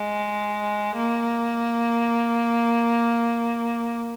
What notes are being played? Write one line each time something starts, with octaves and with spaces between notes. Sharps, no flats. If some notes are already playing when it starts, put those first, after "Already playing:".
Already playing: G#3
A#3